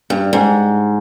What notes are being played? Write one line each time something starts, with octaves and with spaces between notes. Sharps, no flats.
G2
G#2